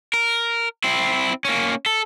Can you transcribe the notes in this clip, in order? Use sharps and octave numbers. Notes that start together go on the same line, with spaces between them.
A#4
C4 E4
A#3 C#4
A4